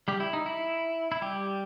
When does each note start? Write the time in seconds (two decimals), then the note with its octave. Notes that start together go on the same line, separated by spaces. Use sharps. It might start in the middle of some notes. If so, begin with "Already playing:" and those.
0.08 G3 G4
0.20 E4
0.33 D#4
0.46 E4
1.12 E4
1.22 G3 G4